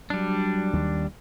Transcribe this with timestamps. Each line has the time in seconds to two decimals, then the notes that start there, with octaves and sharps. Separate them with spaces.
0.10 F#3 G3 D4
0.73 D#2 D#3